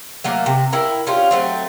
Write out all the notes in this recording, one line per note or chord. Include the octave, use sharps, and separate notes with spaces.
F#3 A3 A#3
C3
E4 A#4 G5
C#4 D4 F4 G4
F#3 A3 C4